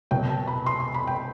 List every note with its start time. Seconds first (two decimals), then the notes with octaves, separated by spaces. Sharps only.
0.11 C2 B2 F#3 G5
0.29 A5
0.47 B5
0.66 C6
0.80 C6
0.94 B5
1.07 G5